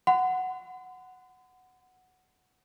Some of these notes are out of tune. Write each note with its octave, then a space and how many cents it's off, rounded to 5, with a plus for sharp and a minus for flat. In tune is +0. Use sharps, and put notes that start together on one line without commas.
F#5 +0 C6 -45